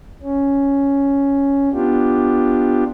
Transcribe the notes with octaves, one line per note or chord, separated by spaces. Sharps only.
C#4
B3 D4 F4 G4